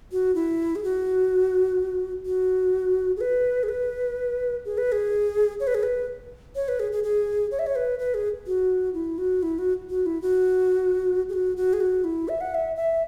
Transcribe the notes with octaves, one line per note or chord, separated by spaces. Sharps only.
F#4
E4
G#4
F#4
F#4
G#4
B4
G#4
B4
G#4
B4
G#4
C#5
B4
G#4
B4
C#5
B4
G#4
G#4
G#4
C#5
E5
C#5
B4
B4
G#4
F#4
E4
F#4
E4
F#4
F#4
E4
F#4
G#4
F#4
F#4
G#4
F#4
E4
E5
F#5
E5
E5